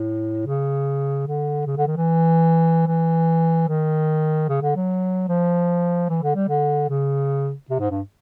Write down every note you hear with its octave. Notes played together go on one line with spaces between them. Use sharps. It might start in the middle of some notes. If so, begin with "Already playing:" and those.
Already playing: A2
C#3
D3
C#3
D3
D#3
E3
E3
D#3
C#3
D3
F#3
F3
E3
D3
G3
D3
C#3
C3
G#2
G2